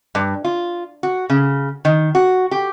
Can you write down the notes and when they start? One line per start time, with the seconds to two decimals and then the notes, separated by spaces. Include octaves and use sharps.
0.15 G2
0.44 F4
1.03 F#4
1.30 C#3
1.85 D#3
2.15 F#4
2.51 G4